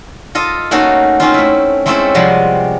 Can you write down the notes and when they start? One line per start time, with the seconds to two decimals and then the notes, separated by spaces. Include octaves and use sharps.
0.35 F4 A4 D#5
0.71 A3 A#3 C#4 D#4 F#4 A4
1.20 C4 C#4 D#4 F4
1.34 A3 E4
1.86 G#3 A3 C4 C#4 E4 A4
2.15 C3 F3 G3 G#3 F#4